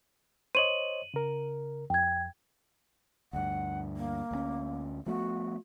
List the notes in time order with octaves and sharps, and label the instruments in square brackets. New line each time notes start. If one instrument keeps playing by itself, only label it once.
[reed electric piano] C5 C#5 D#5 [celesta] D#7 F#7
[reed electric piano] C#3 A#4
[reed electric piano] F2 [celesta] G5 G#6
[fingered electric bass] D2 G2 [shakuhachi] F#5
[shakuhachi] A#3
[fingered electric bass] D2 F3 C#4
[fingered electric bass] F3 A3 B3 [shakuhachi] F#4